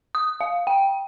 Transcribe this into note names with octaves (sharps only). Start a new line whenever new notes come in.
D#6
F5
G5